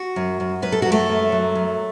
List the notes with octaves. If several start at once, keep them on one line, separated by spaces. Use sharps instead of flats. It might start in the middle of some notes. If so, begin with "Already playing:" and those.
Already playing: F#4
F#2
F#2
F#2 B4
A4
F#2 F#4
A3 A4
F#2
F#3
F#2